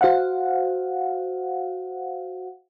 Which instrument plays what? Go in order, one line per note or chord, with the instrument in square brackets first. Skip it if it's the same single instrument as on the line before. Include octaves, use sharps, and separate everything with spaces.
[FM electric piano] F#4 C5 F5 F#5